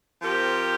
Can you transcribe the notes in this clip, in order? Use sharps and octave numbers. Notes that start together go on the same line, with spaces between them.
F3 C4 G4 A#4